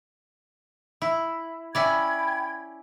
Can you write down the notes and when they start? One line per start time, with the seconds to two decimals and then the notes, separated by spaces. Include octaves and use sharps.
1.02 E4
1.75 C#4 E4 D5 G5 B5 G#6